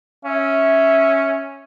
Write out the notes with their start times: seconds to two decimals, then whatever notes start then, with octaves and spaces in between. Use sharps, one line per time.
0.25 C#4 E5